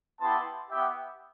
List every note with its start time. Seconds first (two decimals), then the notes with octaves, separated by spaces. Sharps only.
0.21 B3 E4 G4 A5 C6
0.70 B3 E4 G4 E5 G5